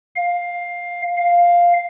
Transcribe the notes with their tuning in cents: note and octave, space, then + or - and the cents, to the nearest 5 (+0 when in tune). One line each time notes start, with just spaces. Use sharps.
F5 +10
F5 +0